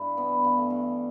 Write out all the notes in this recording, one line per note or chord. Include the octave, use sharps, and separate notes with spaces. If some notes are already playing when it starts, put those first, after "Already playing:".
Already playing: G2 D4 E4
E3 B3
G2
A3
G2